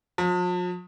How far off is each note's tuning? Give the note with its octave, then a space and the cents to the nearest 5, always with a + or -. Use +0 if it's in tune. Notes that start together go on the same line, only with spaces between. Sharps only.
F3 +45